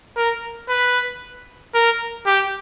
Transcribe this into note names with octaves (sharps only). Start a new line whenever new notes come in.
A#4
B4
A#4
G4